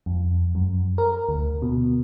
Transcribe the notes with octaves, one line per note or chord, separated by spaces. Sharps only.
F2
F#2
A#4
D2
B2